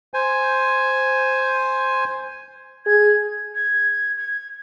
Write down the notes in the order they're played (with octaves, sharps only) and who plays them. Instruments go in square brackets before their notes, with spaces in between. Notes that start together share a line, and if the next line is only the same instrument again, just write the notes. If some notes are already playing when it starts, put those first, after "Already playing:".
[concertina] C5 G#5
[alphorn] G#4 [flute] G#6
[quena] G#6
G#6